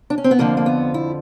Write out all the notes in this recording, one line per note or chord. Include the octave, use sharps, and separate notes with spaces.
D4
C#4
C4
B3
F2 D3 F3 A#3
A#3
B3
E4